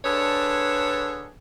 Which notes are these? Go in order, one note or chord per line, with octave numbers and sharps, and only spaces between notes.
D3 D4 G#4 A4 B4 C#5